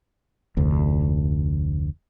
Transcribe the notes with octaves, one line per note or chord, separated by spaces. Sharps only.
F1 D2